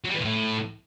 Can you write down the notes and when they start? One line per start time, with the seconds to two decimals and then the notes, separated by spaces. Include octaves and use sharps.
0.04 F#3
0.09 G3
0.14 E3
0.20 A#2
0.25 A2